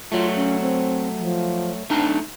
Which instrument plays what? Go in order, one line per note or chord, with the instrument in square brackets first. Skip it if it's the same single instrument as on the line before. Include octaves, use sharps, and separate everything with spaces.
[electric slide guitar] F#3 A3 [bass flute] F4
[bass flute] C#4
C4
F3
[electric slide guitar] A3 D#4 A5 [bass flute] D4